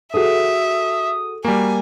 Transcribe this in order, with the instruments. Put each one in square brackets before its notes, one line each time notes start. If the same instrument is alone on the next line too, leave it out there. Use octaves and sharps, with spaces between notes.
[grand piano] F#4 G#4 A4 [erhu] E5 [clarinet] D#6
[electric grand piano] G3 A#3 [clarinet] F#4 [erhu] G#5